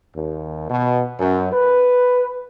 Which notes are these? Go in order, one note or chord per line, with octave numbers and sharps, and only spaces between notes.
D#2
B2
F#2
B4